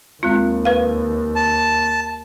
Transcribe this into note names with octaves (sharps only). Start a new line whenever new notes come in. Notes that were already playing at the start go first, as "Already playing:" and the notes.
D#2 G#3 C4 F4
B4 F5
A5